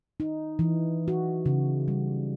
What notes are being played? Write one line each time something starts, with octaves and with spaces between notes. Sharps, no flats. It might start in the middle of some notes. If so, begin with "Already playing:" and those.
D#4
E3
F#4
C#3
G3